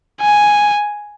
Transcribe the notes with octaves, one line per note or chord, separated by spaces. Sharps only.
G#5